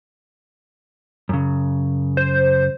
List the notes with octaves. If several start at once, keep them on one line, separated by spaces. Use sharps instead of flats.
F#2 C#3
C5